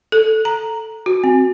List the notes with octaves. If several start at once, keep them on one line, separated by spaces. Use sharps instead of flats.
A4
A#5
F#4
C4